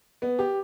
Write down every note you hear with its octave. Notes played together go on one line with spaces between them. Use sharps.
B3
G4